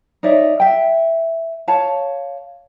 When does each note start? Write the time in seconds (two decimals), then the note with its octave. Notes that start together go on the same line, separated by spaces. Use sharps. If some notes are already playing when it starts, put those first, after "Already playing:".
0.23 D#4 C#5 D5 E5
0.60 E5 G5
1.68 C#5 F5 A5